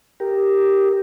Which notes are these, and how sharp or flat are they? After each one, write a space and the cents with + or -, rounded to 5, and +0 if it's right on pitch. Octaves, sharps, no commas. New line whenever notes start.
G4 +0 A#4 +0